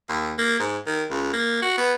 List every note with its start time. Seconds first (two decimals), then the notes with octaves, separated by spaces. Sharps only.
0.09 D#2
0.38 A#3
0.59 G#2
0.86 D#3
1.10 C#2
1.33 A#3
1.62 F#4
1.78 B3